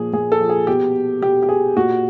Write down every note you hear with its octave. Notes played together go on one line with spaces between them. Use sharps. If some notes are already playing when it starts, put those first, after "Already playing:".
Already playing: A#2 F3 G#4
A#2 G#4
A4
F3
G#4
B2 G4
B2 G4
G4
G#4
A#2 F#4